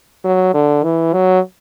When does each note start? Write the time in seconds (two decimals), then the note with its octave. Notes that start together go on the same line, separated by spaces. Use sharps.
0.25 F#3
0.54 D3
0.84 E3
1.13 F#3